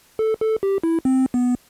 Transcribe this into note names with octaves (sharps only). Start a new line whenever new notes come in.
A4
A4
G4
E4
C4
B3